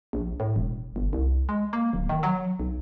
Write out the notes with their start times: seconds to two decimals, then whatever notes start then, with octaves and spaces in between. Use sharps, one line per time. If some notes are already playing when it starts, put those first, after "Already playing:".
0.13 A#1
0.40 A2
0.56 E1
0.96 G1
1.13 C2
1.49 G#3
1.73 A#3
1.93 D1
2.09 D#3
2.23 F#3
2.60 B1